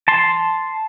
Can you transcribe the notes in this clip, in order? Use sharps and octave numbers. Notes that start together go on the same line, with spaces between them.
A5 C6